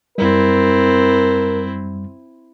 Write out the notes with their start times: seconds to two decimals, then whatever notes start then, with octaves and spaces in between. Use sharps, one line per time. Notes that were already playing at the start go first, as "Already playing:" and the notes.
0.18 F#2 G3 C4 E4 A#4